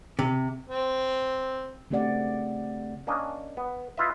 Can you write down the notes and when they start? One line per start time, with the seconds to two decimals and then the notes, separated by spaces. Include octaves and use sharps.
0.19 C3
0.69 C4
1.90 C#3 A3 C4 G4 D5 F#5
3.07 A#3 C#4 D4 D#5
3.57 B3
3.98 E4 F4 B4 D#5 E5